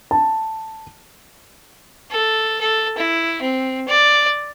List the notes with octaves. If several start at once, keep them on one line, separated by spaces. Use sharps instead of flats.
A5
A4
A4
E4
C4
D5